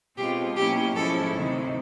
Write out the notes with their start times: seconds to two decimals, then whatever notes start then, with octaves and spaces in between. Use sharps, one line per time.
0.17 B2 G#3 C4 F4 G4
0.56 B2 F#3 A#3 C#4 E4 G4
0.95 G#2 F3 G#3 C#4 E4 A4
1.34 D2 C3 D#3 F#3